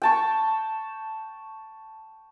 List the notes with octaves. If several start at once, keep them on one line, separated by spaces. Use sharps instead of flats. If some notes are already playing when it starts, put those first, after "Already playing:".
G5 A5 C#6